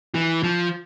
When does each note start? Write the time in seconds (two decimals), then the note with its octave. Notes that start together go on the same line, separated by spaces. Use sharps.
0.15 E3
0.43 F3